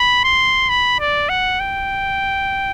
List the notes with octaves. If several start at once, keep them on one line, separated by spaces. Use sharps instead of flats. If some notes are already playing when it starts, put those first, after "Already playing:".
Already playing: B5
C6
B5
D5
F#5
G5